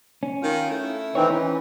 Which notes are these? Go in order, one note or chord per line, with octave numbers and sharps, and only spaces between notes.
C#4
D#3 F4
A3 E4
D#3 E3 C4 C#5
E3 C#4